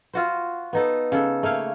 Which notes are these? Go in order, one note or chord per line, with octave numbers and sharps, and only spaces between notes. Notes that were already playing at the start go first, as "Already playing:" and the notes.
F4 F#4 C5
B3 D#4 A4
C#3 A4
A3 A#3 C#5 F5